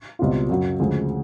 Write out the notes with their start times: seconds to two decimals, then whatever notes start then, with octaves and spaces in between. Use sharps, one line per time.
0.19 C#2 B2 G3 C4 F4
0.49 F#2 C#3 F#3
0.80 D2 C#3 F3 G#3